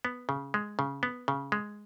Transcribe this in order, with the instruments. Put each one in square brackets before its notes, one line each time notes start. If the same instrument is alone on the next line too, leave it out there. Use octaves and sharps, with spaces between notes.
[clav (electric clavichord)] B3
C#3
G#3
C#3
B3
C#3
G#3